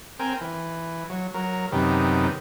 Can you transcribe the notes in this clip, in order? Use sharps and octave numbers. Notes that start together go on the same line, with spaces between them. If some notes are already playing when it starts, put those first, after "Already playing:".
C4 A#4 G5 G#5
E3
F#3
F#3 A#4
F#2 C3 D#3 B3 G4